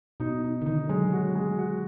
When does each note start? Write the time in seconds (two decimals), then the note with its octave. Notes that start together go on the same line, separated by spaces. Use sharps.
0.20 B2 D#4
0.44 D#4
0.61 D3
0.66 D#3 D#4
0.89 F#3 G#3
1.13 F#4
1.35 G#3
1.59 F#4